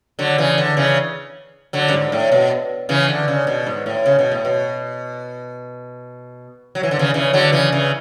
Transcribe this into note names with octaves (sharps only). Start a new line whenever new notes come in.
D3 F#3
C#3 E3
D3
C#3 E3
D3 F#3
F#2
G#2
A2
B2
C#3 E3
D3
C#3
B2
G#2
A2
C#3
B2
A2
B2
F#3
E3
D3
C#3 E3
C#3 E3
D3 F#3
C#3 E3
C#3 E3